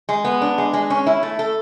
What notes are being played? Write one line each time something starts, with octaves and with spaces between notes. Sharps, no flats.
G#3
B3
D4
G#3
G#3
C#4
E4
A3
A4